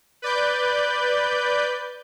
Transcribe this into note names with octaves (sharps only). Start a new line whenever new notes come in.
B4 D5 G6